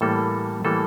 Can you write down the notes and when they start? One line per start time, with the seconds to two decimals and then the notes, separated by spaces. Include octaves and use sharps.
0.01 A2 E3 G3 A#3 A4
0.65 A2 E3 G3 A#3 A4